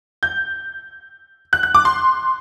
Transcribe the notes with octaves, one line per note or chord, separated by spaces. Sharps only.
G6
F#6
F#6
D6
C6